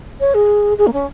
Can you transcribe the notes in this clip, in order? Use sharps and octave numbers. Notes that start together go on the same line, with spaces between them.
C#5
G#4
G#4
A#3
C#4